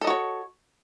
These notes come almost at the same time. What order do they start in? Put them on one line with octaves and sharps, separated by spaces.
A4 D#5 F#4 C#5